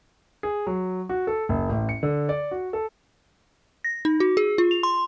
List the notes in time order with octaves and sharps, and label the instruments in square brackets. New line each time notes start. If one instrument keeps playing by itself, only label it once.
[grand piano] G#4
F#3
F#4
A4
F#1
A1
C#7
D3
D5
F#4
A4
[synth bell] A#6
D#4
F#4
G#4
F4
F7
C6